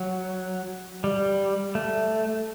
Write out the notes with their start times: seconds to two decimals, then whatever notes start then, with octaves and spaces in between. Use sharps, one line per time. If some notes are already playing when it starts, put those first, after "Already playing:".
Already playing: F#3
1.04 G3
1.75 A3